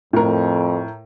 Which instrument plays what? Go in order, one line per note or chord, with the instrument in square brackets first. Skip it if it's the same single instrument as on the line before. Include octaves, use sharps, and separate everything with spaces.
[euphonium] F2 [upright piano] A2 A#4